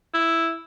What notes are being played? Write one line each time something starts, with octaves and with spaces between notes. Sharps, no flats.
E4